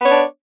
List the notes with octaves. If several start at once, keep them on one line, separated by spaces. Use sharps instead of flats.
B3 D4 C#5